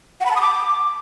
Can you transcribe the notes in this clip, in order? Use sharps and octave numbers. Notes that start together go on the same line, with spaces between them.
F#5
B5
A5
D#6
D6